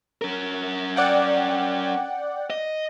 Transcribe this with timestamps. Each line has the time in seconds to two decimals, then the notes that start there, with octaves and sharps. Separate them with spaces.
0.22 C#4 A#4
0.96 D5 F#5 G5
2.50 D#5